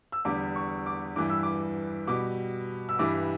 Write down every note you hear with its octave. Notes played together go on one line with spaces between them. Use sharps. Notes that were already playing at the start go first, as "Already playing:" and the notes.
E6
E2 D3 G3 D6
C#6
D6
G2 E3 G3 D6
E6
D6
B2 G3 D6
E6
G2 E3 G3 D6